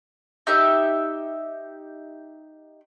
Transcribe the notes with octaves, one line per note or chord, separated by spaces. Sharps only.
D#4 G4 E5